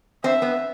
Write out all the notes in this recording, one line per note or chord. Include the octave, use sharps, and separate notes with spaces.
C4 E5
B3